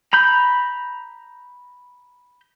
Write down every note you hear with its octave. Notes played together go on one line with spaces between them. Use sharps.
A#5 B5 G6